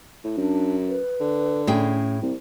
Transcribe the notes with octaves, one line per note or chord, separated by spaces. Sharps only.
A2
F#2 D4
B4
D3
A2 C#4 G#4 G5
C2 C4